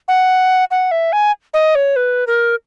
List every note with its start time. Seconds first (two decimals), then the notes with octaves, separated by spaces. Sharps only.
0.08 F#5
0.71 F#5
0.91 E5
1.12 G#5
1.54 D#5
1.75 C#5
1.96 B4
2.27 A#4